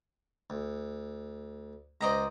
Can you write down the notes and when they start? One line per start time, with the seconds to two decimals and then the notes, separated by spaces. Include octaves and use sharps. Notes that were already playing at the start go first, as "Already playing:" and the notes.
0.50 D2
2.01 C#2 C5 D5 D#5 A#5